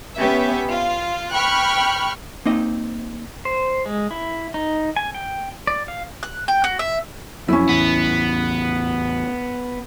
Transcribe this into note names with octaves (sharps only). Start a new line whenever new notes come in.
B3 C#4 G4 E5
F4
G5 B5 C#6 F6 F#6
A#3 C4 D#4 D#5
C5
G#3
E4
D#4
G#5
G5
D5
F5
F#6
G5
F#4
E5
F2 F#3 C#4 E4
A1 E2 B3